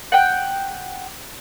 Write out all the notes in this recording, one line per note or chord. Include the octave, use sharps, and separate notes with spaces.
F#5 G5